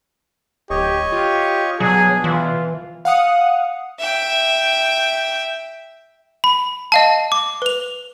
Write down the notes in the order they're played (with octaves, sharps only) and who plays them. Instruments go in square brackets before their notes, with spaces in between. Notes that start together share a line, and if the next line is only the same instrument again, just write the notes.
[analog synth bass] D1 [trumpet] G4 [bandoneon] C#5 D#5 C#6
[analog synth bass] F4 [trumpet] G4
[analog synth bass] B2 [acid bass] F#3 [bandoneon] D4 [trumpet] G#4
[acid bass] E3 [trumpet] F4
[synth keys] F5 F#5 D#6 C#7
[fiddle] E5 G5
[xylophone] B5
D#5 F5 A5
D6
B4 F7